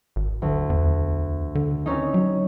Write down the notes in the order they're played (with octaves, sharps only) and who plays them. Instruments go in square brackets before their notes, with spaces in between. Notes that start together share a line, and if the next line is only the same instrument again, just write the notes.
[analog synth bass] G#1
[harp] D2
[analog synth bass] E2
D3
[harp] C4 C#4 D#4
[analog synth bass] F#3